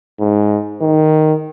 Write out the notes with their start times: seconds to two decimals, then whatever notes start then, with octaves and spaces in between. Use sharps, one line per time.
0.20 G#2
0.81 D#3